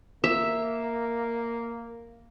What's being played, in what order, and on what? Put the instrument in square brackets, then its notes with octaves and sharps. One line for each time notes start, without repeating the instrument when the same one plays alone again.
[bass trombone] A#3 [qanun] E5